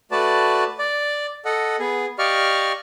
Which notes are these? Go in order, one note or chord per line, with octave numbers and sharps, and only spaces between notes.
A3 F#4 B4 D5 A5
D5
A4 D#5 F#5
B3 G#4
G4 D5 D#5 F5 C#6 F6